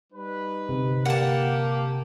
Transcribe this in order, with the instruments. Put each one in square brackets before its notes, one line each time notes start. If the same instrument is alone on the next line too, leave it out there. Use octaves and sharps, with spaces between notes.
[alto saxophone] G3 [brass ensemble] D#4 B4
[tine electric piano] G1 C3
[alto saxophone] A#3 [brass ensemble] G4 [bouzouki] F#5 A5